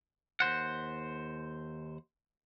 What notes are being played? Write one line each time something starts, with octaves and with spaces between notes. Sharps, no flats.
D#2 F3 C5 F#5